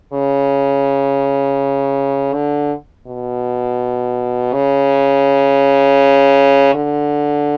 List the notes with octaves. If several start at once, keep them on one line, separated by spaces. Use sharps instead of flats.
C#3
D3
B2
C#3
D3